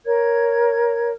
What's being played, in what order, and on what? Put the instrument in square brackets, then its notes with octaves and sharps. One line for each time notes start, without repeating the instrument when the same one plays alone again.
[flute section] A#4 C#5 G#6